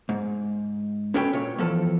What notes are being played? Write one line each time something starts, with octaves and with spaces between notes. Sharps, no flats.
G#2
C#4 F#4 A4 B4 C#5 G5
A#2 C#5
E2 F3 A4